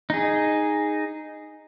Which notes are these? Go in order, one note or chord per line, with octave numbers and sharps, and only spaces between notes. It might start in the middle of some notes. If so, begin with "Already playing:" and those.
D#4 G#4